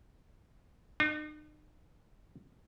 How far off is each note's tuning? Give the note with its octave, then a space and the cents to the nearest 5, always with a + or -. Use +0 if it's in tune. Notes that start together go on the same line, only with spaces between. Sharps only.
D#4 -45